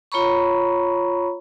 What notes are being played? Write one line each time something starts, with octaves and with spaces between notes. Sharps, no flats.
F4 C#5 A#5 B5 C#6